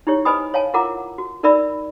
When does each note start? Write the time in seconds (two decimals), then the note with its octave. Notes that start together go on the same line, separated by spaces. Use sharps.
0.07 D#4 E4 G4 C#5
0.25 B4 C5 D#5 G#5 B5 D#6
0.54 C#5 F5 G#5 A5
0.74 E4 F4 A#4 F#5 A#5 D6
1.18 F#4
1.43 D#4 A#4 D5 E5 B5 E6